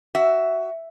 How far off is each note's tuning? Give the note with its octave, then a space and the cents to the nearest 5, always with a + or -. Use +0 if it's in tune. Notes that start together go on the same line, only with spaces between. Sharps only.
F#4 +15 E5 +0